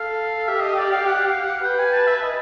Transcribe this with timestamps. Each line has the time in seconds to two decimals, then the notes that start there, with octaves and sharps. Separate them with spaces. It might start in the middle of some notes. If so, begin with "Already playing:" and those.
Already playing: A4 F5
0.48 G4 E5
0.62 D#5
0.78 D5
0.92 F5
1.07 F#5
1.26 F5
1.44 F#5
1.64 B4 G5
1.79 G#5
1.93 A5
2.07 E5
2.22 D#5